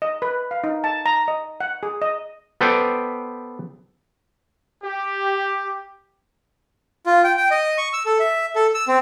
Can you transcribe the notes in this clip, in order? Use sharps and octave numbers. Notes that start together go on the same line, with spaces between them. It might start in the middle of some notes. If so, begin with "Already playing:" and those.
D#5
B4
F5
D#4
A5
A#5
D#5
F#5
G#4
D#5
B3 A4 B4 C5 D5 G5
G4
F4
G5
G5
D#5
C#6
E6
A4
E5
A4
E6
C4